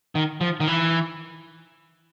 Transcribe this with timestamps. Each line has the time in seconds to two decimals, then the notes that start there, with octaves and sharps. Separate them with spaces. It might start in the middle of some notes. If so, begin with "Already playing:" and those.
0.15 D#3
0.41 F3
0.60 D#3
0.67 E3